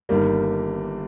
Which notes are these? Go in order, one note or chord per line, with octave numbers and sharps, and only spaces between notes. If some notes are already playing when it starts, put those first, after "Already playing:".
G1 G2 D#3 G3 A#3